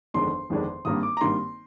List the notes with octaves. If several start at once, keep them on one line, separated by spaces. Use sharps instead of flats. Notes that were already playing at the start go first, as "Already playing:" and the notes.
G1 F2 D#3 G#3 D4 C6
G1 F2 D#3 G#3 D4
G#1 G2 D#3 A#3 D#6
D6
A#5
G#1 G2 D#3 A#3 C6